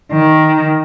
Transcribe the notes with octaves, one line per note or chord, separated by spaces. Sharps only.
D#3